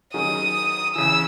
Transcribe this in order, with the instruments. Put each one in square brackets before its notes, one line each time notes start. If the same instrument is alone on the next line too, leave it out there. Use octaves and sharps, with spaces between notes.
[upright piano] D#3 F#3 C#4 G#4 [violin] D#6
[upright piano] E2 C#3 E3 [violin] E6